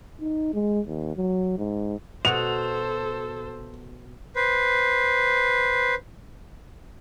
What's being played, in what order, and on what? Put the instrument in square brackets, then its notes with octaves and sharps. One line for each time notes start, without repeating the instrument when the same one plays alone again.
[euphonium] D#4
G#3
D#2
F#3
G#2
[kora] B2 F#4 [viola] A4 C5 [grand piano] F7
[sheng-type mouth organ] B4 C5